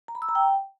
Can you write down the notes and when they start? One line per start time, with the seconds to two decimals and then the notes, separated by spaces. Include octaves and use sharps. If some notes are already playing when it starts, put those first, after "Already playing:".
0.08 A#5
0.15 B5
0.22 E6
0.29 A#5
0.35 G5